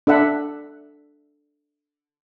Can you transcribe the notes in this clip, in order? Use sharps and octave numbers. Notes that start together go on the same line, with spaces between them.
D4 A4 E5 F#5